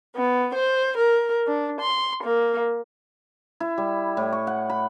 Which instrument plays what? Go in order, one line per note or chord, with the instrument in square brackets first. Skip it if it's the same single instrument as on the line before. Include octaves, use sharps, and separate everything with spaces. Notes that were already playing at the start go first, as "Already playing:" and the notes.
[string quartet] B3
C5
A#4
D4
C6
A#3
[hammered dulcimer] E4
G3
A2
C#6
F#5
B5